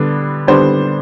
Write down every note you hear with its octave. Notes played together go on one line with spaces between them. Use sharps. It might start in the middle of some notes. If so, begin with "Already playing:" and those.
Already playing: D3 G3 B3 D4
D3 G3 B3 D4 C5